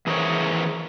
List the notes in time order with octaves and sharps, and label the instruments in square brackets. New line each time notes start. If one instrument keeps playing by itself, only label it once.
[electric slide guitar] E3 G#4 A#4 C5 C#5